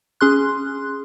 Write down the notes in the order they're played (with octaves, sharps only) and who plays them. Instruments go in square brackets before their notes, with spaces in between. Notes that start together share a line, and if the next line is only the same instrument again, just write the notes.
[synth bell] C#4 G#4 C6 F#6